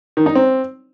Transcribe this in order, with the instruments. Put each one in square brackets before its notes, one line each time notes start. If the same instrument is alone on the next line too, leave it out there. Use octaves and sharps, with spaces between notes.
[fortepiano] D#3
D#4
C4